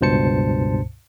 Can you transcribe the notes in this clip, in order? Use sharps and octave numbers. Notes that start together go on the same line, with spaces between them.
C#2 G2 B2 C5 A5 C#7